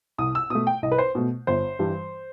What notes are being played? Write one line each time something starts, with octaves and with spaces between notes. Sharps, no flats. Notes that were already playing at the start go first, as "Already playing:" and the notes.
C2 D#6
E6
B2 A3 D#6
G5
C2 D#5
B4
C5
B2 A3
G1 C5
G2 E3 G3